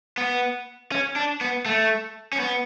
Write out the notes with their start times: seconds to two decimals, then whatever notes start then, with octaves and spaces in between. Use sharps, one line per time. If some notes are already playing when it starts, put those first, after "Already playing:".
0.18 B3
0.92 C#4
1.16 D4
1.41 B3
1.66 A3
2.33 C#4
2.40 B3